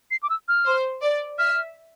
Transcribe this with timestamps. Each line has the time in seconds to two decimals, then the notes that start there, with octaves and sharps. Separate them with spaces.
0.11 C7
0.23 D6
0.30 E6
0.48 F6
0.66 C5
1.02 D5
1.38 E5 F6